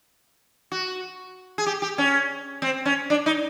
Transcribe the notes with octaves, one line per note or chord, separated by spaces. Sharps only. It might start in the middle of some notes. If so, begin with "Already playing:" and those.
F#4
G#4
G4
G4
C#4
C4
C#4
D4
D#4